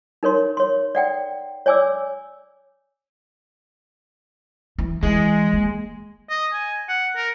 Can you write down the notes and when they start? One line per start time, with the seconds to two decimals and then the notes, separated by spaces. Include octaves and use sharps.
0.23 D#4 A#4 C#5 C6
0.57 C#5 C6
0.95 D5 F#5 G5
1.66 C#5 D5 G#5 D6 E6
4.78 E3
5.03 E3 G#3
5.53 A#3
6.30 D#5
6.53 G#5
6.89 F#5
7.16 A#4